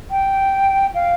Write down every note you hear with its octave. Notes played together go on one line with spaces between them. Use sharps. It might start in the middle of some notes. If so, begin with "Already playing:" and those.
G5
F5